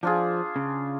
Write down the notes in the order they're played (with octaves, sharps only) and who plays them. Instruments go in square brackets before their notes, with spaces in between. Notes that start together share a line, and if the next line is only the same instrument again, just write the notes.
[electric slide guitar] F3 [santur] D4 F4 G#4
[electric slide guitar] C#3